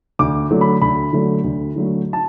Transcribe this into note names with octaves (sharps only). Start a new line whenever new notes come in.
D2 D6
D3 F#3 A3
B5
D2 B5
D3 F#3 A3
D2
D3 F#3 A3
A5